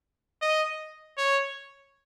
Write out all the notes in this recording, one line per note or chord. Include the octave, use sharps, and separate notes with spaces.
D#5
C#5